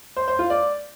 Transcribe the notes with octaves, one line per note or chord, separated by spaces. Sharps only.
C5
C5
F4
D5